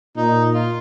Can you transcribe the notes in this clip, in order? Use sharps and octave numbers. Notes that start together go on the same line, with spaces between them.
A#2 D#4
F4